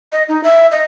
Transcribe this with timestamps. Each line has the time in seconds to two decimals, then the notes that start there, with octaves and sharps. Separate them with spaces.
0.12 D#5
0.29 D#4
0.44 E5
0.71 D#5